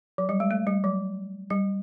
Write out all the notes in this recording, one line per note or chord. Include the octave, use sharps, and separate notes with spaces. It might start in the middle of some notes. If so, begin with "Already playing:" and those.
F#3
G3
G#3
A3
G3
F#3
G3